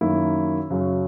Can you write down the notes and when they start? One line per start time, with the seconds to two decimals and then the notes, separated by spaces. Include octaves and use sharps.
0.01 F#2 D#3 A#3 E4
0.70 F#2 C#3 F#3